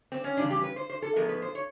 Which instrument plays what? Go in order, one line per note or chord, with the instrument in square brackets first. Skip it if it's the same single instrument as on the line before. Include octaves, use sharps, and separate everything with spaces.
[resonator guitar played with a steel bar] C4
C#4
F2 C#3 E3 G3 D4
G4
B4
C5
C5
A4
A2 F3 G#3 B3 A#4
B4
C5
C#5